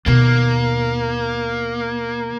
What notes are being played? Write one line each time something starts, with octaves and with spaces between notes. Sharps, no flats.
D#2 B2 A#3